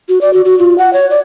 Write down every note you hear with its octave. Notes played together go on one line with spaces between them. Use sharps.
F#4
D5
F#4
F#4
F4
F#5
C#5
D5